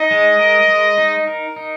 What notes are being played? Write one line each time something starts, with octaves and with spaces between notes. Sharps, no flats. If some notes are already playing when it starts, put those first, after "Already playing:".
Already playing: D#4 D#5
G#3
A#4
G#3
D#4
A#4
D#4